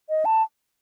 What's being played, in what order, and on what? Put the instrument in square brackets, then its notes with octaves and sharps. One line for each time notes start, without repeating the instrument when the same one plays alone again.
[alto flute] D#5
A5